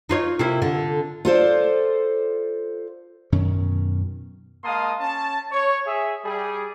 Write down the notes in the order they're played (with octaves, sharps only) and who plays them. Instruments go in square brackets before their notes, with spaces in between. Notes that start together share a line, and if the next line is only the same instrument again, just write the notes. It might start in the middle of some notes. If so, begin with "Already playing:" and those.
[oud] D#4 F4 C#5
C3 A#3 E4
D3
[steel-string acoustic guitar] F4 A4 C5 D5
[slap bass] F#2 B2 D#3 C#4
[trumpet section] G#3 A#3 F5 A5 C6 D#6
C#4 A5
C#5
G#4 E5
G3 G#4